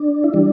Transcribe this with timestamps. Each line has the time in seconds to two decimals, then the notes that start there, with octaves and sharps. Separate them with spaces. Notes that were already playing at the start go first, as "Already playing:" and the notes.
Already playing: D4
0.24 E4
0.33 E3 G3 D4